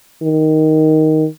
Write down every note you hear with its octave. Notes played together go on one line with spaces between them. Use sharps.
D#3